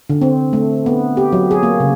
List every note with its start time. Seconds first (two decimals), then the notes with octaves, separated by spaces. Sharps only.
0.10 D3
0.21 C4
0.53 A3
0.86 B3
1.17 G4
1.33 F#3
1.51 G#4
1.63 A#3
1.80 C#3